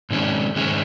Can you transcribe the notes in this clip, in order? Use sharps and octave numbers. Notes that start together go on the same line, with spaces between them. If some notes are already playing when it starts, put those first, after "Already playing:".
G#2 D#3 G#3 C#4
G#2 D#3 G#3 C#4